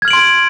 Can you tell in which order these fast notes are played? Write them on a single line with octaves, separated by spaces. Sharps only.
G#6 F6 F#7 D7 C6